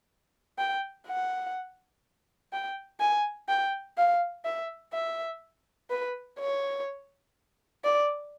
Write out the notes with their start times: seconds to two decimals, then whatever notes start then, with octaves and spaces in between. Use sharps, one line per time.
0.58 G5
1.07 F#5
2.53 G5
3.00 G#5
3.49 G5
3.97 F5
4.45 E5
4.93 E5
5.90 B4
6.39 C#5
7.84 D5